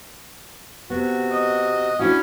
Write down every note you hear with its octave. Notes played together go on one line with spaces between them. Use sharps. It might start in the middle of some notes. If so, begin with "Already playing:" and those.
C3 B3 F#4
D#5
C#4 D4 E4 F#4